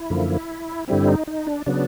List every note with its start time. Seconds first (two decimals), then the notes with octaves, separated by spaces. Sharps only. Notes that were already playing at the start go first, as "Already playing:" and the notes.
Already playing: E4
0.10 F#2 D3 F3 A#3
0.88 G2 D3 G3 C4 E4
1.08 D#4
1.27 D#4
1.47 D4
1.66 C#3 F#3 B3 D4